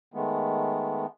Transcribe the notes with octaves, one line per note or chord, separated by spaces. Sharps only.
D#3 G#3 A3 B3